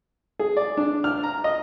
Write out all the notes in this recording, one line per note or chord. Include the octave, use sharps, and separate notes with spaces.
G#4
D5
D4
F6
A#5
D#5